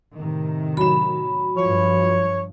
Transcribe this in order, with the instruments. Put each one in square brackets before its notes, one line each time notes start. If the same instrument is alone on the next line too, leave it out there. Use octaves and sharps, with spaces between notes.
[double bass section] A2 C3 D#3
[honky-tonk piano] F#3 E7 [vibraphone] B5
[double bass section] G2 F3 [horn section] C#5